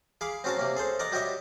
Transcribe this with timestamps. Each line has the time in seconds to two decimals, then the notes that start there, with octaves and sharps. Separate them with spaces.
0.21 G#4 F5 B5 D6
0.44 C4 C#4 F#4 A#4 A5 A#5
0.57 C3 A#3 C#4
0.77 G#4 A4 C5
0.99 A#4 D5 D#5 F#5 A#5
1.12 G3 F#4 G4 C#5 D#5 E5